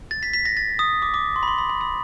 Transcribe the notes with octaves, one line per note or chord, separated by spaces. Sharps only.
A6
B6
B6
A#6
A6
D#6
D6
D6
C6
B5
C6
B5
B5
B5